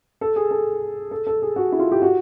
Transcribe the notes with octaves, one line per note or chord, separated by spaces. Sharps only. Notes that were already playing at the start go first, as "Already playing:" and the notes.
A4
G#4
A4
A4
A4
G#4
F#4
E4
F4
G4
F#4